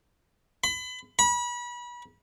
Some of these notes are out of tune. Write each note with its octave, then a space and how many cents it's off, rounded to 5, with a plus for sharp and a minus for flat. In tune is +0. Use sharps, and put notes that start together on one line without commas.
B5 +35
B5 -30